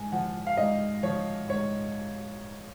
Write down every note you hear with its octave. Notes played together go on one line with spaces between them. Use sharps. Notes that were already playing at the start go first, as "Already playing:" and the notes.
Already playing: G#2 G#5
F3 F#5
F5
G#2 D#5
F3 C#5
G#2 C#5